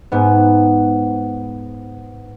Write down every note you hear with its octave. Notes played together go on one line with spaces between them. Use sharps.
G#2 B3